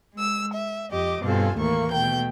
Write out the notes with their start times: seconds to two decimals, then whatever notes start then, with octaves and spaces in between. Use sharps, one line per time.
0.15 G#3 E6
0.55 E5
0.91 F2 G4 D#5 D6
1.22 G2 B2 C4 F4 A4 G#5
1.57 D#2 A2 E3 A3 A#3 C#6
1.92 B2 A3 G5 G6